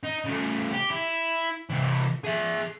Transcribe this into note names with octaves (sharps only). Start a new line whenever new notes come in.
D#4
C#3 A3
G4
E4
C3 E3
G#4 E5